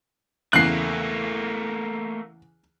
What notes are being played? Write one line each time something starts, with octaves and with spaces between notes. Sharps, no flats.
E2 C#3 A3 A#3 F#6 C7